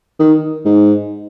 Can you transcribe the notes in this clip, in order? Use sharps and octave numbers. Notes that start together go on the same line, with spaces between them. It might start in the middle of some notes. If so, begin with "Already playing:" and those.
D#3
G#2